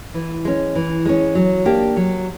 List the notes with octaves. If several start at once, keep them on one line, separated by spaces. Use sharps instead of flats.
E3
G#3 C#4
E3
G#3 C#4
F#3
A#3 D4 G4
F#3